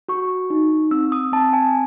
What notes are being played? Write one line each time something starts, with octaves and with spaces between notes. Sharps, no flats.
F#4 C#6
D#4
C4 E6
D#6
C4 A5
G#5